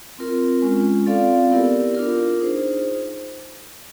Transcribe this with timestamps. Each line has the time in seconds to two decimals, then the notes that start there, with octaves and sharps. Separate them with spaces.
0.19 C4 F4 A#4
0.62 G#3 C#4 F4
1.06 C4 F4 A4 D5 F5
1.50 B3 E4 G4 A#4 D5
1.94 D4 F4 A#4
2.40 D#4 G#4 C5